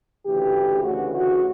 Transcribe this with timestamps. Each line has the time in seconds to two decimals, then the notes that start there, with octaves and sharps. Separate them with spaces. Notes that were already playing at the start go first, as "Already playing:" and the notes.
0.25 D2 C#3 E3 G4
0.83 D2 C#3 E3 F#4
1.12 F#4